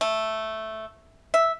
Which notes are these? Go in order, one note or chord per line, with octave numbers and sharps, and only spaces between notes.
A3
E5